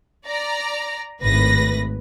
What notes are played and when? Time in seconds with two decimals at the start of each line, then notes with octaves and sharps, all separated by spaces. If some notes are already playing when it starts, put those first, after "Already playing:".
0.25 D5 A#5
1.22 G#1 A2 B4 A#6